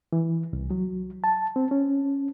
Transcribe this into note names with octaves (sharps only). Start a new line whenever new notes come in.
E3
C2
F#3
A5
C4
C#4